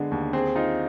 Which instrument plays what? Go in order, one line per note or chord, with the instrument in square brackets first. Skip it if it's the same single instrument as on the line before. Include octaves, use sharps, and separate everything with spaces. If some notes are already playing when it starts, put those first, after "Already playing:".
Already playing: [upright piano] D3 G#3 B3
D#2
[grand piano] C4 [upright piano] G#4
[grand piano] D#4 [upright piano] F4